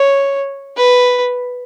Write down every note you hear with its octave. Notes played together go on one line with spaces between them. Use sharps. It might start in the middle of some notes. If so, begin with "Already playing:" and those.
Already playing: C#5
B4